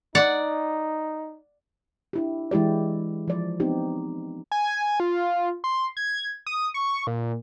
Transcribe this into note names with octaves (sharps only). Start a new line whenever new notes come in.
D#4 D5 F#5
D4 E4 G4
E3 G#3 E4 G4 D5
F3 D5
B3 C4 D#4 G4
G#5
F4
C6
G#6
D#6
C#6
A#2